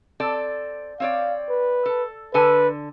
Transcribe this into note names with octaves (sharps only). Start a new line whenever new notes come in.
C4 A4 D5
C4 C#5 D5 F5
B4
A4
D3 A4 B4 G#5